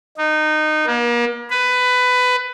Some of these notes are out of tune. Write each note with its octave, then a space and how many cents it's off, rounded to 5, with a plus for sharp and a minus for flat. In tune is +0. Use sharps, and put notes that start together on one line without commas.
D#4 -20
A#3 +40
B4 +15